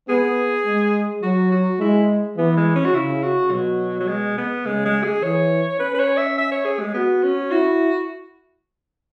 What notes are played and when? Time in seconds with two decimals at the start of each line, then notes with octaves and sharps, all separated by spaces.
0.09 B3 G#4
0.66 G#3
1.23 F#3 F#4
1.52 F#4
1.80 G#3 E4
2.37 E3 B3
2.57 G#3
2.76 C#4
2.85 F#4
2.94 C#3 E4
3.23 F#4
3.51 B2 F#3
4.00 F#3
4.08 G#3
4.38 B3
4.66 C#3 G#3
4.85 G#3
5.04 G#4
5.23 E3 C#5
5.79 C#4 B4
5.94 B4
5.99 C#5
6.17 E5
6.38 E5
6.52 C#5
6.65 G#4
6.80 G#3
6.94 B3 F#4
7.23 C#4
7.51 E4 F#4